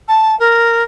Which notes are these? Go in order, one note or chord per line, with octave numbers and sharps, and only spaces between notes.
A5
A#4